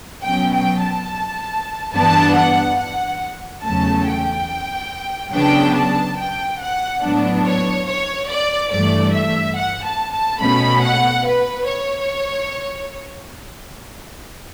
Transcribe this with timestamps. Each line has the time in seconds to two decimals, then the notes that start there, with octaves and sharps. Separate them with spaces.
0.24 B2 F#3 C#4 G5
0.53 G5
0.81 A5
1.94 G2 E3 B3 D4 A5
2.35 F#5
2.79 F#5
3.64 E2 C#3 F#3 A3 C#4 A5
4.06 G5
5.32 C#3 F#3 B3 D4 G5
5.75 A5
6.17 G5
6.60 F#5
7.03 A2 F#3 B3 D4
7.45 C#5
7.87 C#5
8.28 D5
8.71 G2 E3 A3 D5
9.13 E5
9.56 F#5
9.85 A5
10.13 A5
10.40 B2 A3 C#4 B5
10.83 F#5
11.26 B4
11.68 C#5